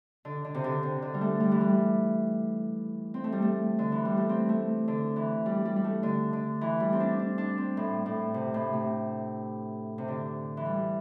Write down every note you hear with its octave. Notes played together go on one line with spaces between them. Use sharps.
D3
D3
C3
D3
C3
D3
G3
A3
G3
E3
G3
C4
A3
G3
A3
D3
E3
G3
A3
C4
A3
D3
E3
G3
G3
G3
A3
D3
D3
E3
G3
C4
D4
D4
D4
C4
A2
A2
C3
A2
C3
C3
D3
E3
G3